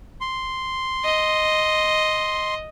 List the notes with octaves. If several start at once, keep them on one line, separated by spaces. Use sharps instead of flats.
C6
D#5